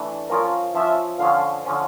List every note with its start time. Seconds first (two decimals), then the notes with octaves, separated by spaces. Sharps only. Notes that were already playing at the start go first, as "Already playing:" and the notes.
Already playing: E3 A3 D4
0.29 F3 C#4 F4 A#4
0.74 F3 C#4 F4 E5
1.19 D3 F3 C#4 F4 F5
1.65 D3 F3 C#4 F4